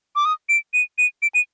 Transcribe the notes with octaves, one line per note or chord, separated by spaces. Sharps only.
D6
D#6
D7
D#7
D#7
D7
D#7